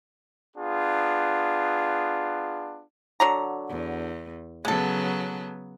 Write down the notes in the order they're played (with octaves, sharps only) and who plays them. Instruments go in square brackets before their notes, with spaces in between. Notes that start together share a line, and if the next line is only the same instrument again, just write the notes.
[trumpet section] B3 D4 F4 G#4
[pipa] D3 F#3 A#5
[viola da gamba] E2
[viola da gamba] C#3 F#3 B3 [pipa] G#3 A4